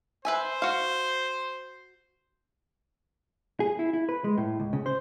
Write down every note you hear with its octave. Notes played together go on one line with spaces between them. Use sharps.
B4 C5 E5 G#5
F#4 F5
G#4
E4
E4
B4
G#3
A2
C#2
C#3
C5